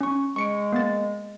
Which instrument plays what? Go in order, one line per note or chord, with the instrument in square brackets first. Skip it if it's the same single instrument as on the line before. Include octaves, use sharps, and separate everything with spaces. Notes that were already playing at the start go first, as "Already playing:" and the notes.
[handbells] C#4 C#6
[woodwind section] G#3 [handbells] C#6 C#7 D7
[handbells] A#3 B3 A6